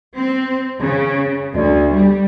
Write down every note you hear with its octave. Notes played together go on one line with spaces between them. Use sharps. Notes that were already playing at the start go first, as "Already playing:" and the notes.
C4
C#3
D2
G3